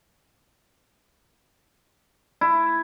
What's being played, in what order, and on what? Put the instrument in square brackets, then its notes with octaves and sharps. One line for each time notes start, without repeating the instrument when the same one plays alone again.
[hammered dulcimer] E4